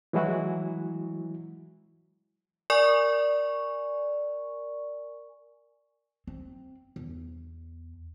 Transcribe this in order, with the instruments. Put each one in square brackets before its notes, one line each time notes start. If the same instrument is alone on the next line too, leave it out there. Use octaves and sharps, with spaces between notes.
[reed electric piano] E3 F#3 G#3 E4 F#4
[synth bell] A#4 D5 G#5 C#6
[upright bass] C4
E2